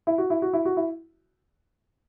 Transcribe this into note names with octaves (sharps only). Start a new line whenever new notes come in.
E4
F#4
E4
F#4
E4
F#4
E4